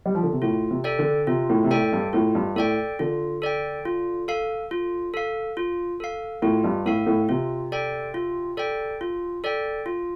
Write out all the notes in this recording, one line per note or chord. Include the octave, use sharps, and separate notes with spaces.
G3
F3
D3
C3
A2 F4
C3
A4 D5 G5
D3
C3 F4
A2
C3
A2 A4 D5 G5
G2
A2 F4
G2
A2 A4 D5 G5
D3 F4
A4 D5 G5
F4
A4 F5
F4
A4 F5
F4
A4 F5
A2 F4
G2
A2 A4 F5
A2
C3 F4
A4 D5 G5
F4
A4 D5 G5
F4
A4 D5 G5
F4